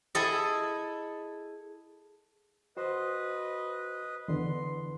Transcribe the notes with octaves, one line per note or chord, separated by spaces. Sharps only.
E4 G#4 A4 D#5
F#4 B4 C5 D#5 C6
E2 D3 B4 C6